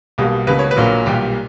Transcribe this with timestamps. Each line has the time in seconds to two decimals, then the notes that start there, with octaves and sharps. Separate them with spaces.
0.18 B1 B2 G3 A#3
0.47 C#2 B2 A#3 B4
0.59 C#5
0.71 B4
0.76 A#1 A#2 F#3 A#3
1.05 B1 A#2 G3 G4